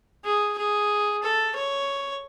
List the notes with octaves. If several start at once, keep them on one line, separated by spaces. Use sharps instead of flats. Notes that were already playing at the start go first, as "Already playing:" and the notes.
G#4
G#4
A4
C#5